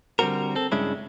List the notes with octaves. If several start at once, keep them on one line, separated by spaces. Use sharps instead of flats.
D3 G3 G#3 C4 F#4 A#4
C4 A4
G2 C#3 G#3 C#4 D4 E4